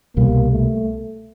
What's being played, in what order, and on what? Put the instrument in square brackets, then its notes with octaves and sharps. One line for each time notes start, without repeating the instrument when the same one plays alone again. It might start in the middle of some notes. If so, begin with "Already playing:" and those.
[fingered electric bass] C2 B2 G3 [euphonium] A#3
[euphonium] A3